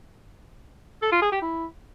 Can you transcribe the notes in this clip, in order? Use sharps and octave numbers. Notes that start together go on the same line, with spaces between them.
A4
F4
G#4
G4
E4